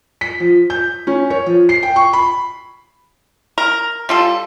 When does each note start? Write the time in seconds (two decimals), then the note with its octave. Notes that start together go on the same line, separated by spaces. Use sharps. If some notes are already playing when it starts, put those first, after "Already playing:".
0.21 B6
0.40 F3
0.70 G6
1.07 C#4
1.30 C#5
1.46 F3
1.69 C7
1.83 G5
1.96 C#6
2.13 B5
3.58 A#4
4.09 G3 F4 A4